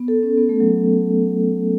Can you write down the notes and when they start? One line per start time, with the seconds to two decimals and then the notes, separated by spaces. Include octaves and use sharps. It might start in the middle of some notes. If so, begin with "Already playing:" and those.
Already playing: B3
0.08 A4
0.23 C#4
0.37 B3
0.49 A3
0.60 F#3